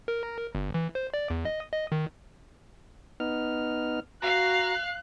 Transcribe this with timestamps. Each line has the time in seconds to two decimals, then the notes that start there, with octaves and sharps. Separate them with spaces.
0.08 A#4
0.55 G1
0.74 E3
0.95 C5
1.14 D5
1.30 E2
1.45 D#5
1.72 D#5
1.92 D#3
3.20 B3 D#4 F6
4.22 F#4 F5 A#5 F#6